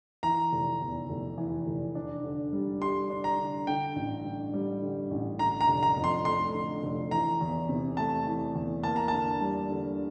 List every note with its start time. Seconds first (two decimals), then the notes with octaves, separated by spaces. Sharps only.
0.23 E3 A#5
0.52 F1
0.81 E2
1.09 F1
1.38 E3
1.66 F1
1.95 D4
2.24 D3
2.52 G3
2.81 G4 C6
3.10 D4
3.24 A#5
3.38 D3
3.67 D3 G5
3.96 A1
4.25 G2
4.53 G3
4.82 D3
5.11 A1
5.39 D3 A#5
5.61 A#5
5.68 F1
5.83 A#5
5.97 F2
6.04 C6
6.25 A3 C6
6.54 D3
6.83 F1
7.11 E3 A#5
7.41 E2
7.69 C3
7.97 A3 A5
8.26 E3
8.55 E2
8.83 A#3 A5
8.96 A#5
9.08 D3 A5
9.41 G3
9.70 D3